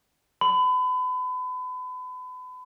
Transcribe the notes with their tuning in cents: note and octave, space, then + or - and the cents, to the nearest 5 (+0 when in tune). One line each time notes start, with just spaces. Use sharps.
B5 +35